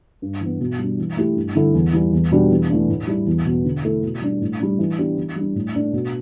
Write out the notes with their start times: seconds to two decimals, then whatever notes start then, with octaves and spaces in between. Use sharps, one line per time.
0.22 G2
0.41 E3 B3
0.60 B2
0.79 G3 D4
0.98 E3
1.17 A3 E4 G4
1.36 G2
1.55 D3 G3 E4 A4
1.74 E2
1.93 E3 G3
2.13 E2
2.31 B2 G3 D4 G4
2.50 E2
2.70 E3 A3 D4
2.89 A2
3.07 G3 E4
3.27 E2
3.46 B2 B3
3.65 D3
3.83 A3 E4 A4
4.03 B2
4.22 G3 D4
4.41 A2
4.60 G3 D4
4.79 E3
4.98 B3 D4 G4
5.17 E3
5.36 G3 D4
5.55 A2
5.75 A3 D4
5.93 B2